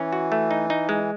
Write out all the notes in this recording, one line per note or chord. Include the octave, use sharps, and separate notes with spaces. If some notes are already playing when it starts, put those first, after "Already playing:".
Already playing: E3 C#4
F#4
A3
D#4
D#4
G#3